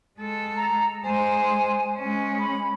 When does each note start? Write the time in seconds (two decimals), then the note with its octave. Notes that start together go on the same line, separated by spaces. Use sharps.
0.18 G#3 A4
0.56 A#5
1.04 G#3 C5 G#5
1.98 G#3 C#4
2.39 B5